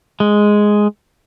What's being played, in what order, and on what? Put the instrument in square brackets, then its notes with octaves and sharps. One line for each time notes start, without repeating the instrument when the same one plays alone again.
[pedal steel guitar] G#3